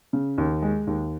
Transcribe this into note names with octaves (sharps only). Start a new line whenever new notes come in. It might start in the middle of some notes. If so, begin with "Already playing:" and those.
C#3
D#2
G#3
D#2